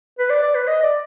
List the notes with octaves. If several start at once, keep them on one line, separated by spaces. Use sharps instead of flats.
B4
D5
D5
B4
D#5
D5